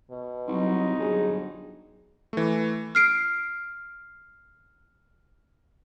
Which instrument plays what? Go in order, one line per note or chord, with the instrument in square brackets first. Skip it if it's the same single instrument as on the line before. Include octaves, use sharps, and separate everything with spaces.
[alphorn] B2
[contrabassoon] C2 [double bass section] F#3 [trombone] D#4
[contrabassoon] G1 [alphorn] G#4
[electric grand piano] E3 A3
[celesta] F6 C7 D7